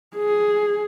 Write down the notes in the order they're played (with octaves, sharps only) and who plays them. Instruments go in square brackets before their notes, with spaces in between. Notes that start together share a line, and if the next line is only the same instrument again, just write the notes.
[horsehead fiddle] G#4